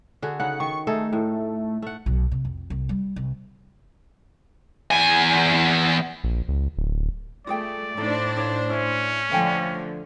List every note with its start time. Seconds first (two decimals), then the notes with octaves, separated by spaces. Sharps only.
0.22 D3 F#4 G#4
0.40 C#3 D#4 F#5
0.60 D#3 C#6
0.87 A3 D#4 G#4 A4
1.13 A2
1.82 A3 F#5
2.06 B1
2.32 C3
2.45 F2
2.70 C2
2.89 G3
3.16 C2
4.91 E2 G#5
6.24 A#1
6.48 C#2
6.77 D1
7.47 A3 F4 G#4 D5 G5
7.97 A2 D4 D#4 A4 C5
8.36 D#4 C#5 F5
8.70 C#4 E4 E5
9.31 D3 F3 A3 F5 G5 G#5